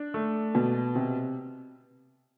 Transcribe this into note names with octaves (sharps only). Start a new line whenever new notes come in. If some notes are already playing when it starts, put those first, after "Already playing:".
Already playing: D4
A3
B2
C3